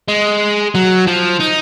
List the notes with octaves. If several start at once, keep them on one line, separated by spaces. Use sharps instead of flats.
G#3
F#3
F3
D#4